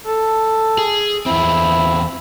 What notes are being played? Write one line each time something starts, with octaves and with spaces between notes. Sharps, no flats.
A4
G#4
E2 C4 E4